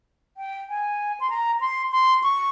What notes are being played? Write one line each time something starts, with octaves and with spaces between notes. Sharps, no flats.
G5
G#5
C6
A#5
C6
C6
C#6